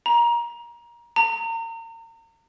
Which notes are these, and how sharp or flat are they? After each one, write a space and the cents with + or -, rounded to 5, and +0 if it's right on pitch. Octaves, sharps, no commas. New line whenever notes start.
A#5 +25
A#5 -35